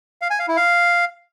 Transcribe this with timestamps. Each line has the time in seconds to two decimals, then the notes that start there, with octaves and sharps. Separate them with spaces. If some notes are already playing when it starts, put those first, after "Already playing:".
0.22 F5
0.30 G#5
0.39 F5
0.48 E4
0.57 F5